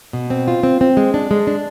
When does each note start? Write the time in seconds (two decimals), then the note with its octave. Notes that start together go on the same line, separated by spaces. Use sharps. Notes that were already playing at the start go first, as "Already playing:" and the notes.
0.13 B2
0.30 C4
0.48 F4
0.63 C4
0.81 C4
0.97 G#3
1.14 D4
1.31 G#3
1.47 D4